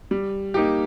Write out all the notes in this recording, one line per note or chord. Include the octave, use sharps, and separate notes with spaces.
G3
A#3 D#4 G4